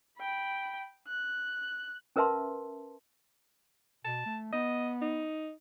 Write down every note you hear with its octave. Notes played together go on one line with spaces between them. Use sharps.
G5 B5
F#6
C#4 A#4 B4 E5 A5 C6
B2 A5
A3
B3 D#5
D#4